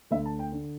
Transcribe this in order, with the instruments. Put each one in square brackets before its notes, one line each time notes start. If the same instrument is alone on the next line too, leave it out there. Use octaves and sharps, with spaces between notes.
[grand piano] D2 D3 E5
A5
G5
D3